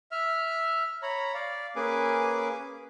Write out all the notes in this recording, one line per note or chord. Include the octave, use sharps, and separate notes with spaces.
E5 F6
C#5 A#5 B5
D5 F5
A#3 C#4 G#4 B4 G#5 D6